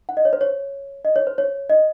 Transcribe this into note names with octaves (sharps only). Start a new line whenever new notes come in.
F#5
D#5
C#5
C5
C#5
D#5
C#5
C5
C#5
D#5